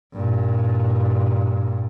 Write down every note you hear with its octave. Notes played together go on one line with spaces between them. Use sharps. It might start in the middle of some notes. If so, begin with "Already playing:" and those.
G2 A#2